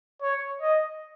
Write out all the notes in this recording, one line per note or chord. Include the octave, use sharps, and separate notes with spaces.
C#5
D#5